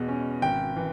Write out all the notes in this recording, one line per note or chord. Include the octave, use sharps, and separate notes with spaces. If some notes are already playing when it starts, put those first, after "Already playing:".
Already playing: E2 B2 G#3
C#4
G#1 G5
E3